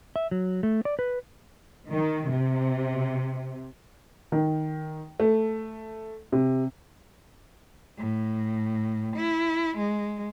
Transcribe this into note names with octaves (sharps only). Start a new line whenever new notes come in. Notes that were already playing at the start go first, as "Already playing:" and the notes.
E5
F#3
A3
D5
B4
D#3
C3
D#3
A3
C3
A2
E4
G#3